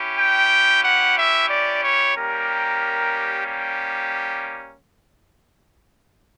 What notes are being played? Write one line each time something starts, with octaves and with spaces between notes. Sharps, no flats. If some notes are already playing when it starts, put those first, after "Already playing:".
Already playing: C#4 E4 G4
G5
F#5
E5
D5
C#5
G3 A#3 C#4 G4 A#4
G4